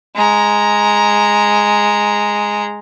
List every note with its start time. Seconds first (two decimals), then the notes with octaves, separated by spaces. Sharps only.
0.15 G#3 A#5